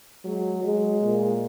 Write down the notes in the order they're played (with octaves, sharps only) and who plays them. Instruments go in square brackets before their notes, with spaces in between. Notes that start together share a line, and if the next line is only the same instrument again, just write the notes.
[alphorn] F#3 [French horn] G#3
[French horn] F#3 [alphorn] G#3
[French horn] A#2